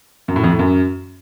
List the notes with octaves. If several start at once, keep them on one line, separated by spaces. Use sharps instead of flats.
F#2
A2
F2
A2
F#2